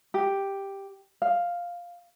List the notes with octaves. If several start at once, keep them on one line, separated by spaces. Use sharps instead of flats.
G4
F5